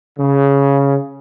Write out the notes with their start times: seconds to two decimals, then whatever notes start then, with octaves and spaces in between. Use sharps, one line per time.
0.18 C#3